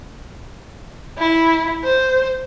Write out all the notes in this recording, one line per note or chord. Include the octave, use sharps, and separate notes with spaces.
E4
C5